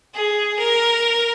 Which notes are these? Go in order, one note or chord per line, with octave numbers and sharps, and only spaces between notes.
G#4
A#4